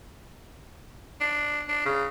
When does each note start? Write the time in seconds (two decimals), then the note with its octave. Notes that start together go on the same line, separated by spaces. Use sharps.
1.21 D4
1.68 D4
1.85 C#3